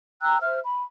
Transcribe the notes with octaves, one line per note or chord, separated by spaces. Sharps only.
G5 A#5 E6 F#6
C5 E5 F6
B5